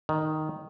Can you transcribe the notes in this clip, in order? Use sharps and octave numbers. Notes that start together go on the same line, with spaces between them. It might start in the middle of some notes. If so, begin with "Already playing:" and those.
D#3